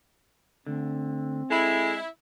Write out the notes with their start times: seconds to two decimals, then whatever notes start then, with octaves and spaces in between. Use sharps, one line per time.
0.67 D2 D3 C4
1.50 G#3 E4 A4 B5